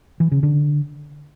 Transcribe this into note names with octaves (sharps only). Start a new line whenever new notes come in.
E3
C#3
D3